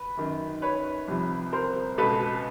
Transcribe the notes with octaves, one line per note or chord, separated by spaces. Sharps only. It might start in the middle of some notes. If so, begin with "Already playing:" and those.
Already playing: B4
F#2 D#3
B4 C#5
C2 C3 F3
A#4 C5
C#2 B2 A4 B4